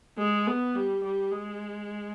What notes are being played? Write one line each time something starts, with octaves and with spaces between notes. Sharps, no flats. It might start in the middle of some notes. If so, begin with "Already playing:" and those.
G#3
B3
G3
G3
G#3